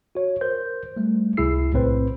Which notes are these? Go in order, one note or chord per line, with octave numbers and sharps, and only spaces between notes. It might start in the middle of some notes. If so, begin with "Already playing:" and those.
F#4 C#5
A#4 C5 G6
G3 A3
C#2 C3 E4 G#4 E6 C7
B1 A2 C3 C4 B4 C5